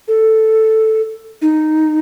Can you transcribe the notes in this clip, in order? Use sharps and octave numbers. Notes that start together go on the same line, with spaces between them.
A4
D#4